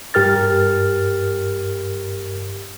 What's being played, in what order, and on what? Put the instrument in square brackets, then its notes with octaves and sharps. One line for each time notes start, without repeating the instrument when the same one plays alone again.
[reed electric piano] G2 G4 A#4 F6 A6